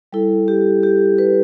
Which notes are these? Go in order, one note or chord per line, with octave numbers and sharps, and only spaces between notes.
G3 E4 A4
G4
G4
B4